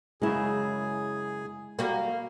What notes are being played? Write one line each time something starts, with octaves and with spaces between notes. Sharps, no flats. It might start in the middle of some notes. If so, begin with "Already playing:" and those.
F#2 C#3 G#3 E4 G#4
G3 A#3 F#4